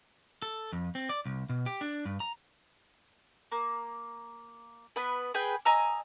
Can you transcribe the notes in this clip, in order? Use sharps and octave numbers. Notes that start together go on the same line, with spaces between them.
A4
F2
C4
D5
C2
B2
G4
D4
G2
A#5
A#3
B3 B4
G#4 B4 G5
D#5 G#5 A#5 E6